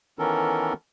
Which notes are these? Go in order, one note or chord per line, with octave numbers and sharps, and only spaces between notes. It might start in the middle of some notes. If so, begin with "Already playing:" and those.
D#3 E3 B3 C#4 A4 A#4